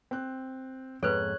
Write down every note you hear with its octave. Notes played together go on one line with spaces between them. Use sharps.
C4 F#6
F2 G#2 B3 A4 B4 C#5 F#6